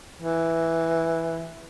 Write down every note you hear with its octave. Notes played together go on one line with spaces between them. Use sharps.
E3